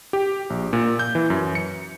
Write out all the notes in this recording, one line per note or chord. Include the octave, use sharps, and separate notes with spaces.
G4
A#1
A#2
G6
E3
F#2
C#7